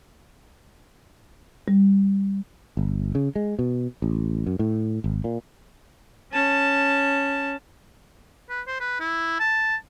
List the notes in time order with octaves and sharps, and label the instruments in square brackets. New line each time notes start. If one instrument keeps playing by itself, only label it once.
[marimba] G3
[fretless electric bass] G1
C#3
G#3
B2
A1
F#2
A2
G#1
A#2
[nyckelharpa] C#4 A5
[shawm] B4
C5
B4
E4
A5